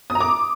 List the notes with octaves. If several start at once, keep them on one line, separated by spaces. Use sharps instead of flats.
D#6
A#5
D6